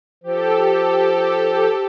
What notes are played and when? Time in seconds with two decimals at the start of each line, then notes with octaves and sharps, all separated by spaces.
0.24 F3 G4 A4